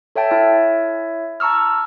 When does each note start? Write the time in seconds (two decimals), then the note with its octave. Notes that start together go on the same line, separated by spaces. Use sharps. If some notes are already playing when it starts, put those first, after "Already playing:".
0.16 A4 C#5 E5 G5 A5
0.31 E4 C#5 E5
1.40 A5 A#5 C#6 E6 F6